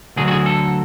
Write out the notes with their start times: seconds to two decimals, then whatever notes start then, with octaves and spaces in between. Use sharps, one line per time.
0.16 D2 D3 F#3 G#4
0.28 F#4
0.31 G#4
0.46 A4